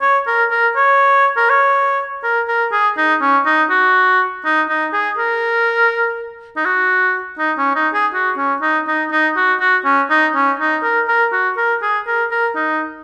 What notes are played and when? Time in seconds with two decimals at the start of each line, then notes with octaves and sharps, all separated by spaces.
0.02 C#5
0.27 A#4
0.51 A#4
0.76 C#5
1.37 A#4
1.50 C#5
2.23 A#4
2.48 A#4
2.72 G#4
2.97 D#4
3.21 C#4
3.46 D#4
3.70 F#4
4.45 D#4
4.69 D#4
4.93 G#4
5.18 A#4
6.57 D#4
6.65 F#4
7.39 D#4
7.58 C#4
7.76 D#4
7.94 G#4
8.14 F#4
8.37 C#4
8.62 D#4
8.87 D#4
9.11 D#4
9.37 F#4
9.60 F#4
9.85 C#4
10.10 D#4
10.35 C#4
10.60 D#4
10.83 A#4
11.08 A#4
11.32 F#4
11.57 A#4
11.82 G#4
12.07 A#4
12.31 A#4
12.55 D#4